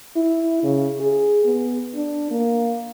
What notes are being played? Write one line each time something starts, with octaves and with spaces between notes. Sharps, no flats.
E4
C#3
G#4
B3
D4
A#3